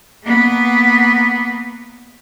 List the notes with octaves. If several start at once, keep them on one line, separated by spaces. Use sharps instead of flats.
A#3 B3